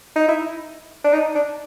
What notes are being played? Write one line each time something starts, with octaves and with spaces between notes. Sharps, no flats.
D#4
E4
D4
D#4
D4